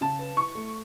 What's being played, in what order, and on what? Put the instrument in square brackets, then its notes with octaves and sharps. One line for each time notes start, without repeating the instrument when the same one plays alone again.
[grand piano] C#3 [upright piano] A5
[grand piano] B4
[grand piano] E4 [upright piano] C#6
[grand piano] A3